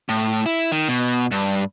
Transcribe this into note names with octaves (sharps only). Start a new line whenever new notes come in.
A2
E4
D#3
B2
G2